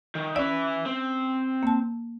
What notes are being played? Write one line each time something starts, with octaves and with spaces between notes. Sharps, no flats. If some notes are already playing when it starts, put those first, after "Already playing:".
D#3
C#4 B4 D5 E5
C4
A#3 A5